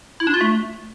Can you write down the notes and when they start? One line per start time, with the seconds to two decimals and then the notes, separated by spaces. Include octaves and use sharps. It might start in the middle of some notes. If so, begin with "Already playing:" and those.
0.20 E4
0.27 D4
0.34 F4
0.41 A3